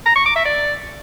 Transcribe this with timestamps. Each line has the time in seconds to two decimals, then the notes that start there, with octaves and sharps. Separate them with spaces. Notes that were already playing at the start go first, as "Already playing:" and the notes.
0.06 A#5
0.16 C#6
0.26 D6
0.36 E5
0.45 D5